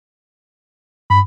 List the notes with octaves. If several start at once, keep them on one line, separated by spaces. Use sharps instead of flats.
G2 B5